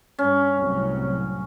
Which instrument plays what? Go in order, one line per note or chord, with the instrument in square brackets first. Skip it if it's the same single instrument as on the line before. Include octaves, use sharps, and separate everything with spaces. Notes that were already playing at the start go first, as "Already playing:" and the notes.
[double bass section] G2 [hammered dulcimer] C#4
[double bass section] C2 A2 F#3